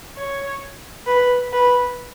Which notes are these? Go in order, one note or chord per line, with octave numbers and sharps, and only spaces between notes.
C#5
B4
B4